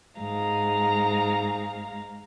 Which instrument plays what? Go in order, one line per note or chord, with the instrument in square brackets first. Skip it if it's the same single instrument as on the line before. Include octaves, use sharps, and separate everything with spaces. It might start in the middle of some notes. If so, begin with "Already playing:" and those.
[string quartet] G#2 G#3 F5 A#5